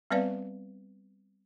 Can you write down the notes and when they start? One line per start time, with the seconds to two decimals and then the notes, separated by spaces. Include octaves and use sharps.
0.11 G3 B3 C4 B4 D5 F5